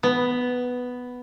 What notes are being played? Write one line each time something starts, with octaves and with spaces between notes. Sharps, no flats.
B3